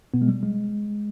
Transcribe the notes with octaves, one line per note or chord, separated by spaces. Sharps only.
B2 B3
G#3
G3
G#3